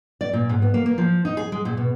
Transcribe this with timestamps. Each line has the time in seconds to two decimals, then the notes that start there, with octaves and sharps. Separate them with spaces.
0.21 D5
0.33 A#2
0.49 G#2
0.62 B3
0.74 A#3
0.86 A#3
0.98 F3
1.25 D#4
1.37 G#4
1.52 G#3
1.65 A#2
1.77 B2